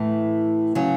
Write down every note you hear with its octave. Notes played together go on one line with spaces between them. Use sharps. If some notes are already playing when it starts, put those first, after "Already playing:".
Already playing: A2 E3 A3
C#3 F#3